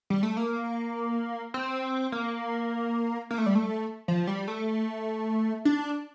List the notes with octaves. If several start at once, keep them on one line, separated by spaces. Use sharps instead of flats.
G3
A3
A#3
C4
A#3
A#3
A3
G3
A3
F3
G3
A3
D4